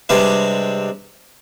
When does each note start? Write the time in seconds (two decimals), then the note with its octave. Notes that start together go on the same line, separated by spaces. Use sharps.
0.09 C3 G3 G#3 C4 D4 B4